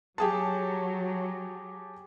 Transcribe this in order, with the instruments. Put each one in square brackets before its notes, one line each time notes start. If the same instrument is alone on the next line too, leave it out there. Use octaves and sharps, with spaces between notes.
[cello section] F#3 [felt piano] G4 G#4 A5